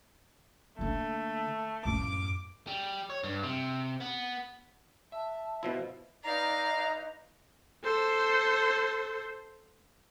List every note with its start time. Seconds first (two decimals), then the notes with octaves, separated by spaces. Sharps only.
0.79 D3 A3 A#3
1.85 F#2 A2 D6
2.67 G3
3.10 C#5
3.23 G2
3.43 C3
4.00 B3
5.12 E5 A5
5.63 B2 F3 E4 D#5
6.24 D#4 B4 D5 D#5 F5 A#5
7.84 A4 C5